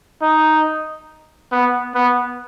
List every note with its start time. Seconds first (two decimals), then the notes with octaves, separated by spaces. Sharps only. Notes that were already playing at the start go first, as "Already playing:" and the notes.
0.22 D#4
1.52 B3
1.95 B3